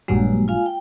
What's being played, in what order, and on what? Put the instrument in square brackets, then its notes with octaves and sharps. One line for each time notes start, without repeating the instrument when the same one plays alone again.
[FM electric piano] A#1 G2 F#3 [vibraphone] G#3 A#3
[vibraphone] F4 F5 G#5
G5